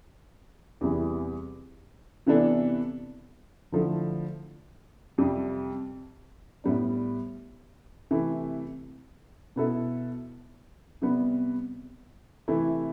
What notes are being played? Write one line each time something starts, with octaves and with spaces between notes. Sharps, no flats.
E2 C3 E3 G3
C3 E3 B3 D4 A4
D3 F3 A3 E4 A4
F2 C3 G3
A2 G3 B3 D4
C3 E3 A3
B2 B3 E4 A4
C3 G3 B3
C3 E3 A3 E4